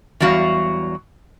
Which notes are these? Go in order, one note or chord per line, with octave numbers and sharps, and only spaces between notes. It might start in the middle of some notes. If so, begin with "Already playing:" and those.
E2 F#3 G3 F#4 F5